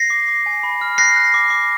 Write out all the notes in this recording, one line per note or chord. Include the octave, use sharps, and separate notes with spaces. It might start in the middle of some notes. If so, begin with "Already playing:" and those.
Already playing: A#6 C7
D6
D6
G#5
B5
F6
F#6 A#6 C7
F#6
D6
D6